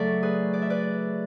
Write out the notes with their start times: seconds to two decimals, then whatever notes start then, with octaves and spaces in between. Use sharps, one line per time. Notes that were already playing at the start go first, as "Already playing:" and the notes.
Already playing: C#3 F#3 A3 A4 D5 E5 F#5
0.23 G#4 B4
0.53 D5
0.62 E5
0.70 B4 D5